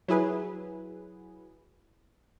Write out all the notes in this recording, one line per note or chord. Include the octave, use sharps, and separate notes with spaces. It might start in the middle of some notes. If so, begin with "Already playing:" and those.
F#3 E4 G#4 B4